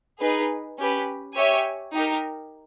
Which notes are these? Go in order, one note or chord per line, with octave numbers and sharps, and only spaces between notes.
D#4 G#4 B4
C#4 G4 B4
G4 C#5 E5 G#5
D#4 G4 A#4